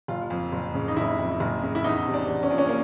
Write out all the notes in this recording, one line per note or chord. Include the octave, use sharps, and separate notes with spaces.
F#1 F4
F2
F#1
C#3
D#4
F#1 E4
F2
F#1
C#3
E4
E2 D#4
C3
D4
E2
C#4
F3 D4
C#4
A#3